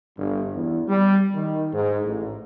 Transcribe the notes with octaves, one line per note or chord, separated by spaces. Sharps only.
G1
E2
G3
D#3
G#2
A1